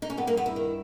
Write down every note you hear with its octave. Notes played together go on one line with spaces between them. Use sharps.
D#4
C#4
G2 B3
A#3
G2 B3
E4
D#3